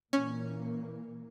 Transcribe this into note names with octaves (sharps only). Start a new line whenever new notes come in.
A#2 E3 A#3 C#4